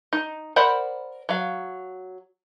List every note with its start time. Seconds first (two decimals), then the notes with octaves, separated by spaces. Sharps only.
0.13 D#4
0.56 A#4 C5 D5 F#5 B5
1.29 F#3 F5